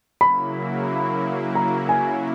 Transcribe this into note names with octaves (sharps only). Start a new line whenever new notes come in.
C#3 F#3 A#3 E4 B5
A#5
G#5